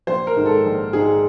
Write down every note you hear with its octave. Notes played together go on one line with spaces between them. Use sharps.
A#1 C5
A#4
G#2 D#3 G#3
A4
A#1
G#2 D#3 G#3 G#4